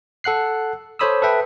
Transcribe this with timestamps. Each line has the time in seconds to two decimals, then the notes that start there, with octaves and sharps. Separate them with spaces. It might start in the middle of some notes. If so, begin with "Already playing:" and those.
0.24 A4 F#5 F#6 C7
0.99 A4 C5 C#5 B5 D#6 E6
1.22 A4 B4 E5 G5